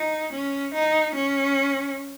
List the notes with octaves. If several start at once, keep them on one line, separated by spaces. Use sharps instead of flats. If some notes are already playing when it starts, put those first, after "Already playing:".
Already playing: D#4
C#4
D#4
C#4